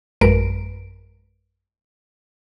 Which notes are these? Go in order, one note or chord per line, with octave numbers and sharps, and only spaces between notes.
A1 F#2 G#3 A#4 B4 D7